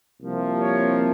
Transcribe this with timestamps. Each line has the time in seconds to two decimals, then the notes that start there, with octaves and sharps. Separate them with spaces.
0.19 C2 C3 F3 A#3
0.59 C#5